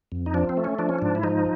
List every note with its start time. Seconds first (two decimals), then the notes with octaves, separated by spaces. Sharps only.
0.12 F2
0.26 D#4
0.34 F3 D4
0.49 C4
0.57 A3
0.64 C#4
0.79 F3 D4
0.89 C#4
0.99 G#2 D4
1.15 E4
1.23 F3 D#4